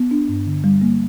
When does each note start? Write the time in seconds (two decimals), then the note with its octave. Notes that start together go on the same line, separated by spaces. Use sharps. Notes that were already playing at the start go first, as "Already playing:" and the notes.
Already playing: B3
0.11 D4
0.28 G2
0.46 D3
0.64 G3
0.82 A#3